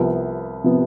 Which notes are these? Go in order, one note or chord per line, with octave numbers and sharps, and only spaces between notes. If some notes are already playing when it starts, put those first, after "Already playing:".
Already playing: C2 C3 F3 B3
C3 F3 B3